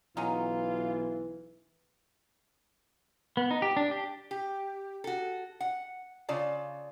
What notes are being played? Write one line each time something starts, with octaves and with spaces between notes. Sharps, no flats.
B1 E3 F#3 C#4 D#4 F4
B3
D#4
G4
D4
G4
G4
F#4 A4
F#5
C#3 F4 D5 A5